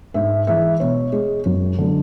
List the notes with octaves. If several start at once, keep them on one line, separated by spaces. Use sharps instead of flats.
G#2 E5
E3 G#3 E5
B2 C#5
G#3
F#2
D3 F#3